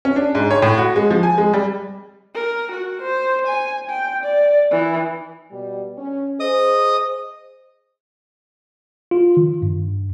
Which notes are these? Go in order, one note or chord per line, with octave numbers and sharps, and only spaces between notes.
C#4
D4
G#2
C#5
A2
F#4
G#3
F3
G#5
G#3
G3
A#4
F#4
C5
G#5
G5
D5
E3
B2 G3
C#4
G#4 C5 D#5 D#6
F4
D#3
G2